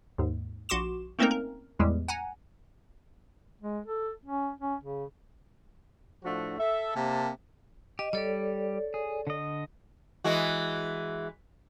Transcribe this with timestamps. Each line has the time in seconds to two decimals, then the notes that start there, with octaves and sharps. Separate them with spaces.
0.18 D#2 G#2
0.69 A#1 F#4 C6 D6 E7
1.19 A3 A#3 C4 C#4 D#4 A#4
1.31 A#4
1.79 E2 A2 G3 G#3
2.08 F#5 G#5 A#5
3.62 G#3
3.87 A4
4.25 C#4
4.61 C#4
4.84 C#3
6.24 A2 F3 A3 D4 F#4
6.58 A4 E5
6.95 C3 A#3 A5
7.99 G4 D#5
8.13 G3 G4 A4 C#5 D5
8.94 G#4
9.27 D3 D#5
10.24 E3 G#3 F#4